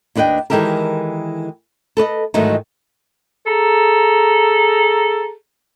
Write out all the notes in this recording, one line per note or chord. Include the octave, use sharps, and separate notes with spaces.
D#2 D4 B4 D#5 G5
D#3 E3 G#3 G4 A4 A#4
A4 B4 D5 D#5
G#2 D#3 E3 F#3 A3 D#4
G#4 A4 A#5